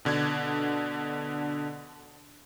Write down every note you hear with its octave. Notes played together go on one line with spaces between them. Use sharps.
B2 D3 D4 G#6